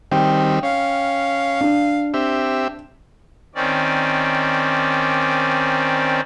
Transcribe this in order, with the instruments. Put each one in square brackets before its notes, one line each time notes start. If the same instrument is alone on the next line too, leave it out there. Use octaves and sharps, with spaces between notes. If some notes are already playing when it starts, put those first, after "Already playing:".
[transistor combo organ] D#3 G3 C4 [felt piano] G5
[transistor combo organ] C#4 [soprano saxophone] F5
[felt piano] D4
[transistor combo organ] C4 G4 E5
[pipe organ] D#3 C4 C#4 D5